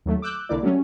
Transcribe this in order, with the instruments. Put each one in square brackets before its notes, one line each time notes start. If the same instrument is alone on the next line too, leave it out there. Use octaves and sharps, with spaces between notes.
[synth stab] D#2 F#3 A3
D6 E6 F#6 G6
C2 D3 A#3 E4 D5 D6
F#3 G3 A3 C#4